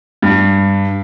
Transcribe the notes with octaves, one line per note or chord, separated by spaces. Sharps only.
G2